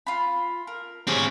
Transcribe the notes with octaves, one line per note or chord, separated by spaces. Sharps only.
F4 B5
A#4
C4 G4 G#4 C#5 C#6